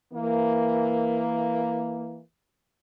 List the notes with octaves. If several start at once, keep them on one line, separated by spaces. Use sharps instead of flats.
E3 A#3